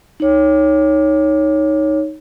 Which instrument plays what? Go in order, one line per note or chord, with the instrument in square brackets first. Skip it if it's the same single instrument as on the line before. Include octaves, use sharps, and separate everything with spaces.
[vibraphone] D#4 C#5